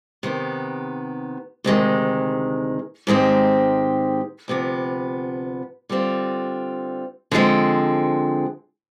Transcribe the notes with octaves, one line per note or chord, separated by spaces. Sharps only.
C3 D#3 B3
D2 C3 D#3 G#3
G#2 D#3 G#3 C4 G4
D2 C3 F3 B3
D3 G3 C4 F4
D3 F3 G#3 C4